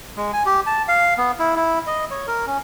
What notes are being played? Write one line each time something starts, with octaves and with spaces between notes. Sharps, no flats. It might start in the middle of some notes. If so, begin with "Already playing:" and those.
G#3
G#5
G4
A5
F5
B3
E4
E4
D#5
C#5
A#4
C#4